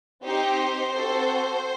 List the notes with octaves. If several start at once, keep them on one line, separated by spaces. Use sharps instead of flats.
C4 D#4 G4 C5
C4 F#4 A4